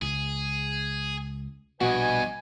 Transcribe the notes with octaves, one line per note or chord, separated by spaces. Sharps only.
C#2 G#4
A#1 G2 B2 B3 F#4 B4 D#5 G#5